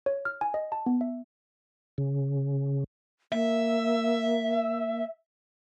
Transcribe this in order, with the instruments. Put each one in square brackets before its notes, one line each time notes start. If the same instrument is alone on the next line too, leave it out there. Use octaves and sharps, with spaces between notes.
[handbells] C#5
F6
G#5
D#5
A5
B3
E5
[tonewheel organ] C#3
[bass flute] A#3 [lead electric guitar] E5